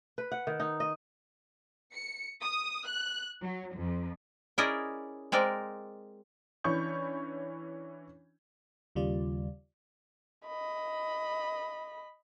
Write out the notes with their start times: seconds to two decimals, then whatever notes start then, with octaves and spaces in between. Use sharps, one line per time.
0.18 B4
0.32 F#5
0.47 D#3
0.60 D#4
0.80 D#5
1.92 C#7
2.41 D#6
2.86 F#6
3.41 F#3
3.76 F2
4.58 C#4 E4 G#4 A#4 D5 D#5
5.32 G#3 C4 A#4 D5
6.64 E3 C#4 D4 B5 C#6 G6
8.95 D#2 C#3 G3 F4 D5
10.46 D#5 B5